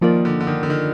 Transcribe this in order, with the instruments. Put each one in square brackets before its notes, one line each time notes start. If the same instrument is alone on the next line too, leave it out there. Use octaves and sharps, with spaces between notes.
[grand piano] D#3 [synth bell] F3 A#3 F4 A#4 D5
[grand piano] D3
D3
D#3
D3
D#3